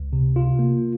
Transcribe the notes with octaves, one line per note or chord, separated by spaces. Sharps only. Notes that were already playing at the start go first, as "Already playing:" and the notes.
Already playing: C#2
C3
F4
A#3